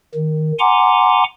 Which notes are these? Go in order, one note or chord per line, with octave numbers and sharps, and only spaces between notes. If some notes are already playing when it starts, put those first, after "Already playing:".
D#3
F#5 G#5 A#5 C6 D6